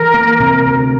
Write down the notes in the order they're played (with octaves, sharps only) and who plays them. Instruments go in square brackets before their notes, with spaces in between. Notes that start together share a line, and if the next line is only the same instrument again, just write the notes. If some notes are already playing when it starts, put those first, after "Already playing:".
Already playing: [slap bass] E3 [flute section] A#4
[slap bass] A#3
C3
D2